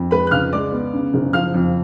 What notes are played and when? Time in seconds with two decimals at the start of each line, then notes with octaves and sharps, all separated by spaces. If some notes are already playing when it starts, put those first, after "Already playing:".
Already playing: F2
0.11 G#3 B4 B5
0.27 F#6
0.31 C#2 F5 F6
0.53 G#3 D5 D6
0.72 B3
0.94 C#3
1.14 F#1
1.33 F3 F5 F6
1.54 F2